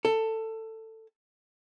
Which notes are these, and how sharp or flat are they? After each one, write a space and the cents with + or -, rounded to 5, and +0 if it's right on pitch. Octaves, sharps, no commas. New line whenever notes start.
A4 +15